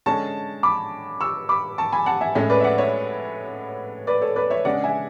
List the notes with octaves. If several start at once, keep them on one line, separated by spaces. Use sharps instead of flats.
D3 G#3 C#4 A5 C#6
B5 D6
C#6 E6
B5 D6
A5 C#6
G#5 B5
F#5 A5
E5 G#5
A2 G#3 C#4 C#5 E5
B4 D5
E5
D5 F#5
C#5 E5
B4 D5
A4 C#5
B4 D5
C#5 E5
C#3 G#3 D4 D5 F#5
E5 G#5